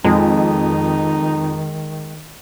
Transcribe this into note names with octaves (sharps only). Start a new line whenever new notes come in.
F2 D#3 G#3 D#4